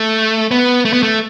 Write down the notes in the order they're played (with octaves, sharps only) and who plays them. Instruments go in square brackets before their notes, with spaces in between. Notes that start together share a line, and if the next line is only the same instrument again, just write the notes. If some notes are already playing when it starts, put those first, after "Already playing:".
Already playing: [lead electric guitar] A3
B3
A3
B3
A3